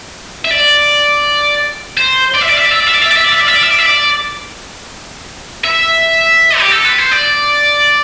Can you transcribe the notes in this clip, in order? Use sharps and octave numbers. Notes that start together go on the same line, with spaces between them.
E5
D5
C5
D5
E5
D5
E5
D5
E5
D5
E5
D5
E5
D5
E5
D5
E5
D5
E5
D5
E5
D5
E5
D5
E5
G4
A4
B4
C5
D5